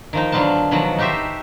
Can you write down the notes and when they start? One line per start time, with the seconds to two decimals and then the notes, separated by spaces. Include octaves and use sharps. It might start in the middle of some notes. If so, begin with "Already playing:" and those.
0.13 D#3 F3 D#4
0.32 D3 F#3 B3 F4 A5
0.71 B2 D#3 F3 F#3 F#5
0.98 D#4 F#4 G4 C5 E5